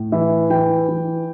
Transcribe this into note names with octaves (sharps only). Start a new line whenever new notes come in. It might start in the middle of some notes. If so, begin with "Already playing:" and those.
Already playing: A2
E3 E5
E3 G5
E3